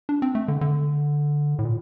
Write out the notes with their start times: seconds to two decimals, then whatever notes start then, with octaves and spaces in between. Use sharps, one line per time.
0.09 D4
0.22 C4
0.35 A3
0.48 D3
0.61 D3
1.59 A2
1.65 A#2